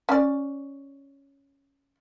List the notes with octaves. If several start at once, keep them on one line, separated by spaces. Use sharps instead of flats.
C#4 D5